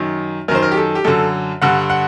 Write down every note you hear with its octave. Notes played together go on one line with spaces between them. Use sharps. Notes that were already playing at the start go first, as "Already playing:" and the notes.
Already playing: F#2 D#3
F#2 D#3 A#4 C5
A#4
G4
A4
G4
F#2 D3 A4
G2 D3 F#5
F#5